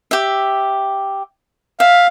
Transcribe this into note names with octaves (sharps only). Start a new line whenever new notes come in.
G4 E5
E5 F5